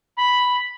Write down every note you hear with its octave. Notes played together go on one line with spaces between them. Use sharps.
B5